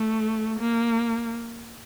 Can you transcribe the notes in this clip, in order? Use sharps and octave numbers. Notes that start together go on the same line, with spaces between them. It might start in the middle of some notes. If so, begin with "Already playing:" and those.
Already playing: A3
A#3